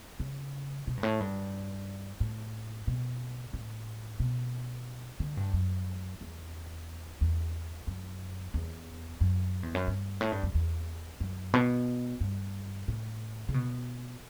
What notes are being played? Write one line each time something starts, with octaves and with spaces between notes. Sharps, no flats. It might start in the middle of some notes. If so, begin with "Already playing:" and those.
C#3
B2
G2
A2
G2
A2
B2
A2
B2
D3
G2
F#2
E2
E2
F#2
E2
F#2
E2
F#2
G2
A2
G2
F#2
E2
F#2
B2
G2
A2
C#3
B2